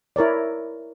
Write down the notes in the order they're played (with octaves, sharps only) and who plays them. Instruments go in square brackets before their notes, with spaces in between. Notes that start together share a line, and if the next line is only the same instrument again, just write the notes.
[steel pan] E4 A#4 C#5 D5